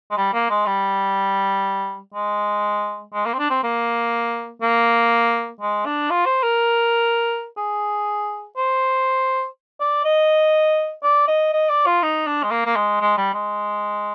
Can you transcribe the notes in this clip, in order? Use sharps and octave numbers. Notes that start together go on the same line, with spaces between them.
G#3
G3
A#3
G#3
G3
G#3
G#3
A#3
C4
D4
C4
A#3
A#3
G#3
D4
F4
C5
A#4
G#4
C5
D5
D#5
D5
D#5
D#5
D5
F4
D#4
D4
G#3
A#3
A#3
G#3
G#3
G3
G#3